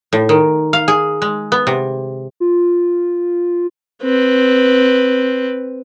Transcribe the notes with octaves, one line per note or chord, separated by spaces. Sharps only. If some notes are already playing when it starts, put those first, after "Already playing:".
A2
D#3
F5
G#4
G#3
B3
C3
F4
C4 B4